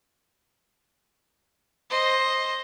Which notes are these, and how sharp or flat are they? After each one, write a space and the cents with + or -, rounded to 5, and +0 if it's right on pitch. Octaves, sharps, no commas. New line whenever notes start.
C5 +10 D#5 +0